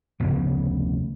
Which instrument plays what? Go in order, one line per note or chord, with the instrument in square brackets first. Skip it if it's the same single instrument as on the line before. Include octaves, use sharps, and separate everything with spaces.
[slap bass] F1 D2 C#3 B3